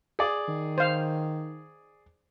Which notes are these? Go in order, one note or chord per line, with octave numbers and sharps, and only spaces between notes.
G#4 D5
D#3
C5 F5